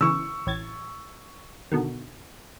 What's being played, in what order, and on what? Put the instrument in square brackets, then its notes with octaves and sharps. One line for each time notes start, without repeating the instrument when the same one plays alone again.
[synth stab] C#3 E3 [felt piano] C#6 E6
[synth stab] A1 G#6 A6
B2 D3 D#3